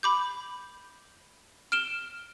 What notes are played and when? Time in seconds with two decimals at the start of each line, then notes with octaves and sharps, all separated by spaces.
0.03 B5 D6 G6
1.72 F6 D7 E7 G7